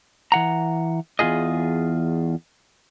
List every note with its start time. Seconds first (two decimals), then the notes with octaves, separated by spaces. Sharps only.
0.32 E3 F#5 A#5
1.19 E2 B2 F4 G#4 D#5